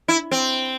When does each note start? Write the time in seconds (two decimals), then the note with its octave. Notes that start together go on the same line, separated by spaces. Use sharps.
0.08 E4
0.31 C4